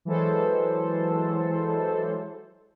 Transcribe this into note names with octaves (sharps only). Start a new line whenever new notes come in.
E3 F#3 G#3 A4 C5